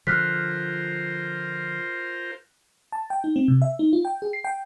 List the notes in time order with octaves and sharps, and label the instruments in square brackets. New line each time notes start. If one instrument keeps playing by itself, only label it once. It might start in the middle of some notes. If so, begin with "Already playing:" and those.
[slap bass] D3 F3 [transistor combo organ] F4 A#4 C5 [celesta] F6 F#6 B6
[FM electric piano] A5
G5
D#4
C4
C3
E5
D#4
F4
G5
G#4
C7
G5